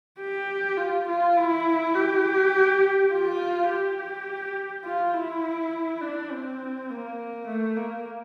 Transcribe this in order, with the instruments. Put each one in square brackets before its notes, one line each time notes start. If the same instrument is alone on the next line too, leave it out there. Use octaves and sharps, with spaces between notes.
[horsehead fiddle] G4
F4
F4
E4
G4
F4
G4
F4
E4
D4
C4
A#3
A3
A#3